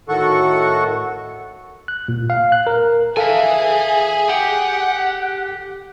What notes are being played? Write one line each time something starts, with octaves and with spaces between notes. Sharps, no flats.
A2 D#3 F#4 A4 F#5 C#6
F#6
A#2
F5
F#6
A#4
G#4 A4 E5 F5 G#5
G4 F#5